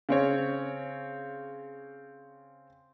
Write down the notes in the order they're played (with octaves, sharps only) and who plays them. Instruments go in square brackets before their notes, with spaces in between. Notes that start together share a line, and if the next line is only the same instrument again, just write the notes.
[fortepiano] C#3 C4 C#5